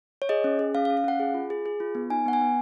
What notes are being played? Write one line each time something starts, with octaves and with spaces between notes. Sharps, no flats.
C#5
G#4 D#5
C#4
G#4
C#4 F5
F5
C#4
F5
C#4 F#5
G#4
F4
G#4
G#4
F4
B3
D#4 G#5
B3 F#5
G#5
B3